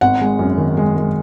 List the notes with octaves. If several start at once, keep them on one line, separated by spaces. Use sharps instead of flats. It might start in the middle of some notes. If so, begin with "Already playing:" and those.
G#1 F#5
G#3
F#2
D#3
G#3
G#3